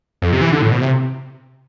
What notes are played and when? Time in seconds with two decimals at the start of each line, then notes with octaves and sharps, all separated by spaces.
0.22 F2
0.32 C3
0.41 E3
0.52 D3
0.62 A2
0.72 B2
0.81 C3